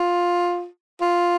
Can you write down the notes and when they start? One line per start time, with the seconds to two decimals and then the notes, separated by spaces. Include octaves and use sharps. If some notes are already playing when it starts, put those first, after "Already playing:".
Already playing: F4
1.01 F4